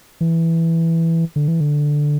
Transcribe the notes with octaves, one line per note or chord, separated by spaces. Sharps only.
E3
D3
E3
D3